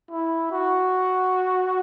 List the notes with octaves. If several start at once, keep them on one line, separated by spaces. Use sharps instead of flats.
E4
F#4